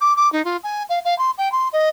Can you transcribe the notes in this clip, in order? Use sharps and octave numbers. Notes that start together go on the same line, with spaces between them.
D6
D6
D#4
F4
G#5
F5
F5
C6
G5
C6
D#5